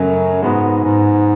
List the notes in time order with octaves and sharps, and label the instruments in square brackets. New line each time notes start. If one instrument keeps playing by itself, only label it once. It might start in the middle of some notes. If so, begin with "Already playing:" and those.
Already playing: [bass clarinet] F#2 [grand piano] C#3 F#3 A3 C#4
[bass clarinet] G#2 [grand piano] G#3 B3 F#4
[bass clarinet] G#2